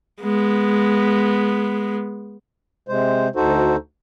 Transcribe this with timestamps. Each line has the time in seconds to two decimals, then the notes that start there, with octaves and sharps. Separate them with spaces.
0.21 G#3 B3
2.88 C3 G#3 C5
3.36 D2 D#4 F#4 A4 C5